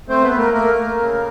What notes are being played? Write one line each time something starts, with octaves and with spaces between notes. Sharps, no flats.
A3 C4 C5
B3 B4
A3
A#3 A#4
A3 A#3 A#4
A3
C#3